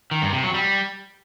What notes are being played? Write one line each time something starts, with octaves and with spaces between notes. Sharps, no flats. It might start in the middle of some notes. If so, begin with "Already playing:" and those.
D#3
G2
C3
F#3
G3